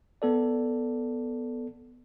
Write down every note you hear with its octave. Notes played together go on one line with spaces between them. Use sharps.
B3 A4 D5